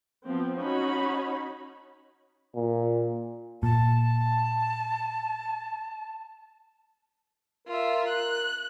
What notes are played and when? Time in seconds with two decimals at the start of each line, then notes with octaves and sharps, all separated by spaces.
0.26 F3 B3 C4
0.61 C#4 D#4 F#4 C#5 B5
2.56 A#2
3.63 A#2 A5
7.67 F4 A#4 E5
8.08 F#6